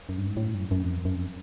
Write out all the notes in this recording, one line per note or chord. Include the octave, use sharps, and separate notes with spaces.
F#2
G2
G#2
A2
G2
F#2
F#2
F2
F#2
F2